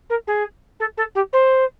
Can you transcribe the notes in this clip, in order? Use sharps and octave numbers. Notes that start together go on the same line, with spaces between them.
A#4
G#4
A4
A4
G4
C5